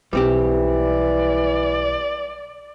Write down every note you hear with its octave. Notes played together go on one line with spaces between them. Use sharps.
B1 E3 G3 C4 G4
D5